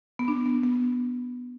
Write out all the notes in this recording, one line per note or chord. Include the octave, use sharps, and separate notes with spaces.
B3
D4
B3
B3